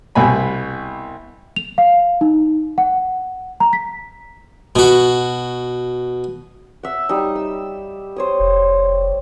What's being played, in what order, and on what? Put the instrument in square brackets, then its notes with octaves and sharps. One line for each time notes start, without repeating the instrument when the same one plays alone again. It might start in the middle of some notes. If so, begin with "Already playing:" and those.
[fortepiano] C2 B2 G#5 B5
[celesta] F7
F5
D#4
F#5
A#5
B6
[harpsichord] B2 F#4
[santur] E5 F#5
G3 D#4
E6
C5 C#5 D#6
[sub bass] F1